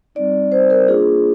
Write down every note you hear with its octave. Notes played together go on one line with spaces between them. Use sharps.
G3 C4 D#4 D5
C5
A#4
A#3 D4 F4 G#4